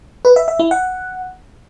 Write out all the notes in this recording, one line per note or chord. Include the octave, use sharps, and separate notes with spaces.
B4
E5
E5
E4
F#5